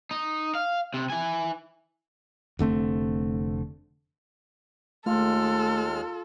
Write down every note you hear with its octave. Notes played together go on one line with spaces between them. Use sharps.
D#4
F5
C3
E4 G#5
F1 D3 A3 C4
D#2 G#3 A3 F4 A4 F6